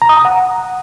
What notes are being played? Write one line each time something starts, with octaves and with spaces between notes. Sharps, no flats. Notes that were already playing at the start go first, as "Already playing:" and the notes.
A#5
D#6
A#5
F#5